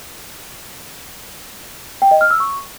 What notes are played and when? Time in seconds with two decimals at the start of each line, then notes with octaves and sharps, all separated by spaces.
2.02 G5
2.11 D#5
2.21 F6
2.31 E6
2.40 C#6